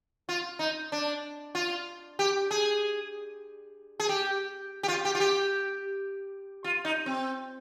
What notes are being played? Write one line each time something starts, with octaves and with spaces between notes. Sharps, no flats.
F4
D#4
D4
F4
G4
G#4
G#4
G4
G4
F4
G4
F4
G4
F4
D#4
C4